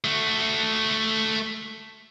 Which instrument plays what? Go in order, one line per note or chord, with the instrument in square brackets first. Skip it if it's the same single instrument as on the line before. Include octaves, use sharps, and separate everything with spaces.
[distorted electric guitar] A3 F#4